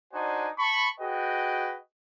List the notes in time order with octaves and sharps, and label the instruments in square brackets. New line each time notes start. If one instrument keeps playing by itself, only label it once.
[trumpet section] D4 D#4 F#4 C5 D5 G#5
A5 B5 C#6
F#4 G#4 B4 D#5 G5